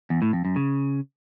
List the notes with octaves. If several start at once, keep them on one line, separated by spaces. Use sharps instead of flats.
E2
A2
F2
F#2
C#3